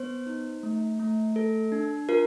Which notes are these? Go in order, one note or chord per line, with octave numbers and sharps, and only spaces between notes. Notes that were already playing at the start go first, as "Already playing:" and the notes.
Already playing: B3 C5
D#4
A3
A3
A4
D4
F4 A#4